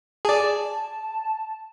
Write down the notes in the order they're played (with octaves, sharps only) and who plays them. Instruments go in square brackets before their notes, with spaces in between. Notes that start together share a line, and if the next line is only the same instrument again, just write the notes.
[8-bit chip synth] G#4 D5 [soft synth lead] A5